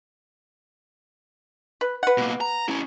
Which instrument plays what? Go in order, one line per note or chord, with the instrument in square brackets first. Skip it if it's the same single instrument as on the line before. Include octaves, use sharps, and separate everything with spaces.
[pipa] B4
B4 F#5
[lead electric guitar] B2 A#3
A#5
C#4 E4